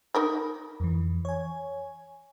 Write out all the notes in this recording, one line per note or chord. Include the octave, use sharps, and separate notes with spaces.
D#4 A#4 B5
F2 E3
C#5 G#5